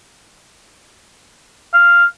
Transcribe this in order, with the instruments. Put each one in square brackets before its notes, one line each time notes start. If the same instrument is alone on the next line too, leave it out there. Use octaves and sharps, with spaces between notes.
[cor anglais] F5